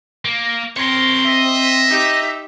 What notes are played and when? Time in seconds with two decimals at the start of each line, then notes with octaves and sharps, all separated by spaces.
0.25 A#3
0.77 C4 A#4 C#5 C6
1.26 D#5 E5
1.88 D#4 G4